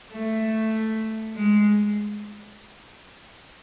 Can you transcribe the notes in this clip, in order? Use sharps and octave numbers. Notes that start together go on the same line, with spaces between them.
A3
G#3